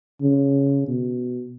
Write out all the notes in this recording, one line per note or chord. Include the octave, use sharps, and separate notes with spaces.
C#3
B2